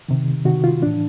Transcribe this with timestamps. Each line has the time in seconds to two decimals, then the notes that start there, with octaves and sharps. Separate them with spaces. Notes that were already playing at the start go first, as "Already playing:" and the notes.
0.09 C3 D#3
0.45 C3 D#3 F#4
0.64 F4
0.82 A2 E3 D4